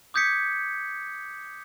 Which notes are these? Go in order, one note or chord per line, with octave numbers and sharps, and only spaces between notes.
D6 D#6 G6 G#6 B6 C#7